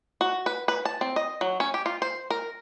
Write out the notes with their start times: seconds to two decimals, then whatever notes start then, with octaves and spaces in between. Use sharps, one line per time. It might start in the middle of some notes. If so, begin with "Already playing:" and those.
0.21 F#4
0.46 B4
0.68 B4
0.85 A5
1.01 C4
1.16 D#5
1.41 F#3
1.60 C#4
1.74 G4
1.86 F4
2.02 C5
2.30 A#4